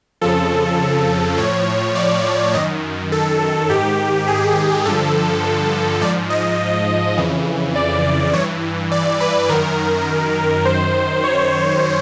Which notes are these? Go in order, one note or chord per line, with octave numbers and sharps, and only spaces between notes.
F2 C#3 F3 A4
A2 F3 C#5
D5
F#2 D#3 D#5
A4
G#2 D#3 G4
G#4
G2 D3 F3 A4
G#2 F3 D5
D#5
F2 C#3 E3
D5
G2 E3 C#5
D5
B4
F#2 D#3 A#4
F#2 D#3 C5
C#5